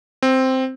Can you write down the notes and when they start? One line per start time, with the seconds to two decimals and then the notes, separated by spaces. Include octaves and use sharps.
0.22 C4